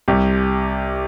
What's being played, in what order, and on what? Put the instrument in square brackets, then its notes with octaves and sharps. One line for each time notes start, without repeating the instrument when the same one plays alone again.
[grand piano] C2 G4